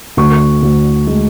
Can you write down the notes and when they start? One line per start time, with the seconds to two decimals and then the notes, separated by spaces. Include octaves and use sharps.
0.17 D2 C#6
0.62 D2
1.07 G#3